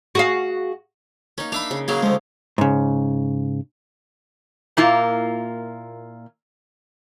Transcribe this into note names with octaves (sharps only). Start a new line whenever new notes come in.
F#4 G#4 F5
A#3 C#4 D#4
D4 E5 F5 B5
C#3
C#3 F#3 A#3 G#4 F5
D2 F3 G#3
G#2 C#3
A#2 A#3 E4 F4